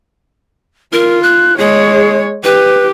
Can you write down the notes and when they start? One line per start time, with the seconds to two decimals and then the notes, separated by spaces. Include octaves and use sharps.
0.93 F4 A#4
1.23 F#6
1.59 G#3 G#4 C#5
2.44 G4 B4